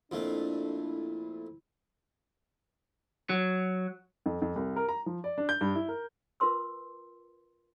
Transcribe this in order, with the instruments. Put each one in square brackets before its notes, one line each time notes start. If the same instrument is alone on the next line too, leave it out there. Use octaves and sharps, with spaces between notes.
[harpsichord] F2 A#2 A3 [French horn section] D4 [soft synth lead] E4
[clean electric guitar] F#3
[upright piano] F2
F2
C2
A#4
A#5
F3
D5
D4
G6
G2
E4
A#4
[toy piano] F4 A#4 B4 C6 E6